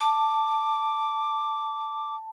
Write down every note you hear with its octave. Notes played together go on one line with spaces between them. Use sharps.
A5 D6